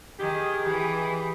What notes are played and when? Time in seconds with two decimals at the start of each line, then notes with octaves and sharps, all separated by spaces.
0.19 D#3 G4 G#4
0.66 E3 G4